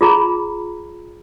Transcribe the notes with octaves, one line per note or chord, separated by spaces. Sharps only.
F4 G#4 A#5 B5